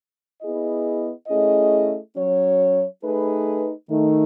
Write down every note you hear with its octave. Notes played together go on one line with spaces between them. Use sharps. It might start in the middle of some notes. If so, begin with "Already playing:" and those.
B3 E4 G#4 D#5
A3 C#4 E4 G#4 D#5
F#3 C#4 F#4 C#5
A3 D#4 G#4 B4
D#3 A3 D#4